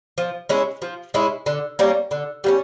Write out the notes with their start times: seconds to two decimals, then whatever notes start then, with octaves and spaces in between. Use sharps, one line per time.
0.18 F3
0.49 G#3 C#4 E4
0.82 F3
1.14 G#3 C#4 E4
1.46 D3
1.79 G3 A#3 C#4
2.11 D3
2.44 G3 A#3 C#4